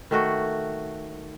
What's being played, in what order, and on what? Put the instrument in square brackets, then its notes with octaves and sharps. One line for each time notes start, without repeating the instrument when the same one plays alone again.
[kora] D#3 A3 F#4